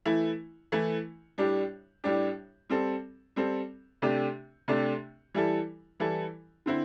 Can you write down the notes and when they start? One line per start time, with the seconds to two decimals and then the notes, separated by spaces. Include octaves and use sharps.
0.06 E3 A3 E4
0.72 E3 A3 E4
1.38 A2 G3 D4 G4
2.04 A2 G3 D4 G4
2.70 G3 C4 A4
3.36 G3 C4 A4
4.02 C3 A3 D4 G4
4.68 C3 A3 D4 G4
5.34 E3 G3 E4 A4
6.00 E3 G3 E4 A4
6.66 D3 C4 E4